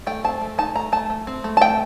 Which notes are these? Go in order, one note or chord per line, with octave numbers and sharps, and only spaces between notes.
A3 G5
C4 A5
A3
D#4 A5
A3 A#5
A3 A5
A3
C4
A3
A5
A3 G5